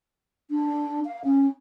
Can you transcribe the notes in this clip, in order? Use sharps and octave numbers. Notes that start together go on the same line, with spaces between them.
D4
F5
C#4